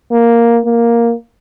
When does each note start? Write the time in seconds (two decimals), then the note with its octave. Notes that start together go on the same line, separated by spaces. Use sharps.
0.11 A#3
0.65 A#3